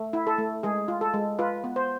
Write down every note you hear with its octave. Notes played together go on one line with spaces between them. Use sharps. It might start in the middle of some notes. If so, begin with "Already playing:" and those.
Already playing: A3
E4
A4
A3
G#3 G#4
F4
A4
G#3
F4 B4
B3
C5